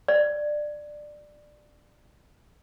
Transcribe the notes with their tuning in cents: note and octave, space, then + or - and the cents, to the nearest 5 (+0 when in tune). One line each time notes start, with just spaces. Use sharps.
D5 +15